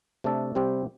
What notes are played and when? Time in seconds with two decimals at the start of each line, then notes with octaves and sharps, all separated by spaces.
0.24 C3 A3 D4 A4
0.55 C3 G3 C4 G4